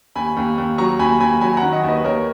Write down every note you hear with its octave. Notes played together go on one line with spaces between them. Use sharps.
D#2 G#5 B5
D#2
D#2
F#3 A#5 C#6
D#2 G#5 B5
D#2 G#5 B5
F#3 G#5 B5
F#5 A#5
D#3
D#5 F#5
D#2
B4 D#5
D#2 A#4 C#5